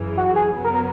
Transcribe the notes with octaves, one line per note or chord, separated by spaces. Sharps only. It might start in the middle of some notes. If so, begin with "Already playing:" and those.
Already playing: F#2 C#3 E3
F#4
G#4
F#2 C#3 F#3 B3
A#4
A#4